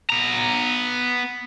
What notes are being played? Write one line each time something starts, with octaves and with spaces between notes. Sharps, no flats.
B3 A#5